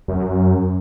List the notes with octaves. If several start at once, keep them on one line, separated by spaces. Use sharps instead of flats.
F#2